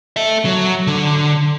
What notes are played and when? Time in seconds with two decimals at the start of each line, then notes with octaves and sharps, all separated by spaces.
0.16 A4 E5
0.45 F#3
0.87 D3